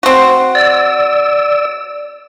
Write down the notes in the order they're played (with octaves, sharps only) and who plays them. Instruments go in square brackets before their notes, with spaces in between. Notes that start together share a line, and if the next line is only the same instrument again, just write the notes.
[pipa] C4 F#4
[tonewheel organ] D5 E6